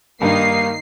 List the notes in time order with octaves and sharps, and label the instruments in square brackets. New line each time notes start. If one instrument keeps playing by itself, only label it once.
[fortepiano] G2 [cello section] D#3 D#4 [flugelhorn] A#3 [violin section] C7